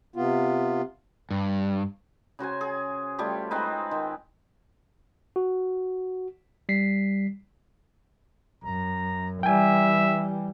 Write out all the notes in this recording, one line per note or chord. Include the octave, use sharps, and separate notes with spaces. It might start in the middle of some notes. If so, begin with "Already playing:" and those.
C3 B3 F4
G2
C#3 F#4 C5 G#5
G#4
G3 A3 F4 G4
G#3 C4 D#4 B4
D#3
F#4
G3 B6 C7
F#2 A#5
E3 G3 E5 G5 G#5